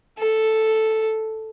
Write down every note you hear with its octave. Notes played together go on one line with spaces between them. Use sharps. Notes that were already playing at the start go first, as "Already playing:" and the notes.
A4